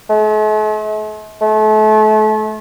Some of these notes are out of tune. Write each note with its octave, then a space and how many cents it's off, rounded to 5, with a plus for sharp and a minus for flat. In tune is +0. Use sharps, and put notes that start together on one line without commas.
A3 -45
A3 -35